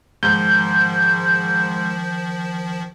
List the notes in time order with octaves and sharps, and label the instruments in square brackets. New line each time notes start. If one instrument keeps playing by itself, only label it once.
[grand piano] G#2 [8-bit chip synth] D#3 F3 [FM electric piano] G6